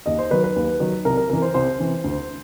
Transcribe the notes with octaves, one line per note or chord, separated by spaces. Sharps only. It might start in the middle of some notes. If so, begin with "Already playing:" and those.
D#2 D#5
C5
D#3 F#3 B4
B4
D#2
D#3 F#3
C2 A#4
A#4
C3 E3 A#4
C5
C2 C5
C3 E3
D2